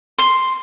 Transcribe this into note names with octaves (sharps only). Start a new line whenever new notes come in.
C6